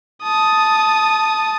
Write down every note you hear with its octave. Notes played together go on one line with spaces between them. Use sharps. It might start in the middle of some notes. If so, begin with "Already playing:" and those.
A5 D#6